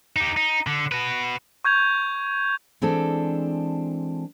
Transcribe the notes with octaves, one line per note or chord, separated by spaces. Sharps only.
D#4 G4
D#4
D3
F#4 B4
C#6 G6 G#6 F7
E3 G#3 C4 D4 A4